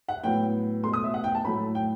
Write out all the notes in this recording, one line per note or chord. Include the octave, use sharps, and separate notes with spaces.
F#5
A2 F#3 B3 G5
B2 A3 C6
D#6
E5
F#5
G5
A5
A2 F#3 A3 B5
G5